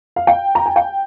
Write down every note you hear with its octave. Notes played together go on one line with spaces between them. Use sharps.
F5
G5
A#5
G#5
G5